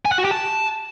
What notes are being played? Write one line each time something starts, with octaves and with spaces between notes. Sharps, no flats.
G#5
F#5
F#4
G4
A5